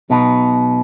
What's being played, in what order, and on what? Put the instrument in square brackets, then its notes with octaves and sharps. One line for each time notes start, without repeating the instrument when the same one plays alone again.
[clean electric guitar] B1 B2 B3 D#4